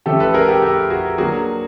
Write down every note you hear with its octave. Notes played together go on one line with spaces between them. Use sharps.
F3 A3 C#4 G4 A4
A4 B4
G#4 A#4
G4 A4
G4 A4
F#4 G#4
F#3 A#3 D4 F#4 G#4